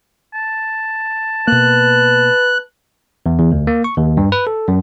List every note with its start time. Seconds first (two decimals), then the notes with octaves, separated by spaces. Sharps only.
0.34 A5
1.47 B2 A#3 B4 F#6
3.26 E2
3.39 E2
3.52 D2
3.67 A#3
3.84 C#6
3.97 D#2
4.17 G2
4.32 B4
4.47 A4
4.68 F#2